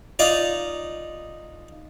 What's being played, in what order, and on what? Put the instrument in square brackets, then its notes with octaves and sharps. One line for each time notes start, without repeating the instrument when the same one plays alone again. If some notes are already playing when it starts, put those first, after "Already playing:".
[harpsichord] D#4 F4 D5